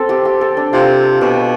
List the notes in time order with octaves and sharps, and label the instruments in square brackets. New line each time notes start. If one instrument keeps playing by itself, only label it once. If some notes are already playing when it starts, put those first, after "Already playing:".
Already playing: [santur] C4 A4
G4
G4
A4
D4
[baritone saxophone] C3 [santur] F4
[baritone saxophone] B2 [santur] G4